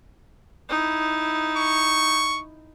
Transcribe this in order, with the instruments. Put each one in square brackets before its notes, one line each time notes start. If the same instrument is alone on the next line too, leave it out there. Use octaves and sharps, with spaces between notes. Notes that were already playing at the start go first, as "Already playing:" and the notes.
[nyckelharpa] D#4 E4
[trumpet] C#6